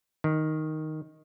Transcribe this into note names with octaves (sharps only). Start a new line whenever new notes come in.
D#3